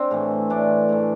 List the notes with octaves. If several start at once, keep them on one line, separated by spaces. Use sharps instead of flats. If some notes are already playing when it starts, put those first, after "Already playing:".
Already playing: C4 D4
A2 E3 A3
A2 E3 A3 D4
A2 E3 A3